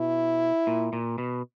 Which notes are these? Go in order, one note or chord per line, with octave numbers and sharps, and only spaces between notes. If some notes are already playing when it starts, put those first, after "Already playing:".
Already playing: B2 E4
A#2
A#2
B2